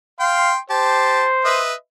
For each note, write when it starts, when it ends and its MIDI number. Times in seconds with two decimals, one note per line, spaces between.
0.20 0.53 77
0.20 0.58 79
0.20 0.58 84
0.70 1.26 67
0.70 1.61 72
0.70 1.26 81
1.45 1.74 71
1.45 1.74 75
1.45 1.74 76